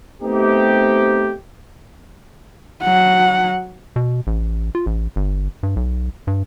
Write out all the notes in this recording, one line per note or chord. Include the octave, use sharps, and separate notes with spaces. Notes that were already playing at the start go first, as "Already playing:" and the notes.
A3 B3 C4 D#4 G4
F#3 F#5
B2
A1
F4
A1
G1
G2
B1
G2